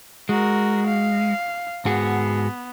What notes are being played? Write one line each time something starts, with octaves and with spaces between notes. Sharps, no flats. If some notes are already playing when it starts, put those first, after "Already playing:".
G#3 F#4 A#4
F5
G#2 B3 F#4 G#4